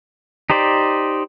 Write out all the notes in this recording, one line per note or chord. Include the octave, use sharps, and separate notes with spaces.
D#4 G4 C5 D5